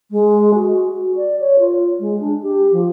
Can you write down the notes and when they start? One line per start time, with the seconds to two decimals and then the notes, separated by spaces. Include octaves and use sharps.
0.11 G#3
0.54 F#4
0.92 F#4
1.16 D5
1.40 C#5
1.59 F4
1.99 G#3
2.20 D4
2.42 G4
2.72 F3